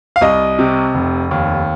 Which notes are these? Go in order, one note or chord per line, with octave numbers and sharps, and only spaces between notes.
F5
C2 D#5
C3
F1
D#2